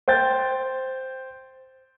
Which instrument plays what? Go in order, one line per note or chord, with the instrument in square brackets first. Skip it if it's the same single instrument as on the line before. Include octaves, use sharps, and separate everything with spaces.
[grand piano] C5 G5 G6 A6